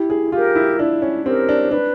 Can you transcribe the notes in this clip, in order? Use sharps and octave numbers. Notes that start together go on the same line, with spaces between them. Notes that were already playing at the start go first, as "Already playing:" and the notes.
Already playing: E4 G4
G#4
F4 G4 A#4
E4
D4 E4
C#4
C4 G4 A#4
D4
D4 B4